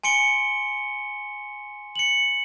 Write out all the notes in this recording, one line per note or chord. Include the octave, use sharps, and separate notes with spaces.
G#5 C6 C#7 D7 G7
C#7 F#7